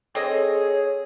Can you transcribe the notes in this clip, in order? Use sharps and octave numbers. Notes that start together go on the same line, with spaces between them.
C4 G#4 A4 C#5 D#5